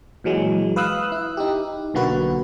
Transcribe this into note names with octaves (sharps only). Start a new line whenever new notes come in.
A#2 E3 F#3 G#3
B4 F5 D#6 E6 F#6
E4
D#4 G4
B1 D3 A#3 F#4 B4